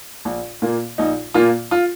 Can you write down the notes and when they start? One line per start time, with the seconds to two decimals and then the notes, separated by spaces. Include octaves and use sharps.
0.25 A#1
0.62 A#2 A#3
0.98 A#1 D#4
1.34 A#2 A#3 F4
1.71 F4